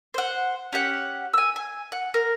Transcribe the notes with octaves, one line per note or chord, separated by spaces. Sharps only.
C5 F#5
C#4 G4 F#5
G#5 E6
G#5
F#5
A#4